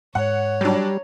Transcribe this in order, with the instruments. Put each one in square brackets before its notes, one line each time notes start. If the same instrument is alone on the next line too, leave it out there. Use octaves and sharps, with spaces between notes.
[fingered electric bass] G#2 G#3 [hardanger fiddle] C#5 [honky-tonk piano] F#5
[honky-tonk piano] F#3 D4 [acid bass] G3